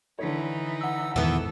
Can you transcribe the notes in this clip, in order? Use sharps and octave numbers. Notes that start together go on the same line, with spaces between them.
D3 E3 D#4 C#5
F#5 E6
E2 G#2 D#3 E3 B3 A4